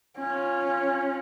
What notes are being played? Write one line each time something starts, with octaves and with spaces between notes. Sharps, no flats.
C#4 F4